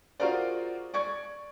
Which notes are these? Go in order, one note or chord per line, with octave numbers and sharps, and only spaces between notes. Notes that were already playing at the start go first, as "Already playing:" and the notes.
F4 F#4 G#4 A#4 C5 D5
D5 C#6 G#6